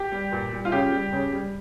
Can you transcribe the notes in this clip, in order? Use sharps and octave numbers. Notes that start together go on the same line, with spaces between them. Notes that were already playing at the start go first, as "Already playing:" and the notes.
Already playing: G4
G3
A#2
G3
F4
C#3 G4
G3
C#3
G3